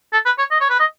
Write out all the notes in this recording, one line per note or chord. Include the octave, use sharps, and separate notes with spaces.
A4
B4
C#5
D#5
C#5
B4
D#5